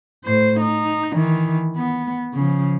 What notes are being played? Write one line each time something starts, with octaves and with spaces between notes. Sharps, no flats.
A2 C5
D#4
D#3 E3
B3
C#3 F3